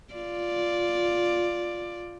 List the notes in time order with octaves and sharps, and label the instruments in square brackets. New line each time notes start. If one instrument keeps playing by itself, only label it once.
[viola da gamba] F4 D5